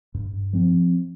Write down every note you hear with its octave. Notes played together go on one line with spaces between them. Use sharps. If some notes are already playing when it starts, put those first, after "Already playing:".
G2
F3 C4